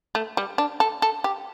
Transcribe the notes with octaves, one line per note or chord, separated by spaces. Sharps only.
A3
G3
D4
A4
A4
G4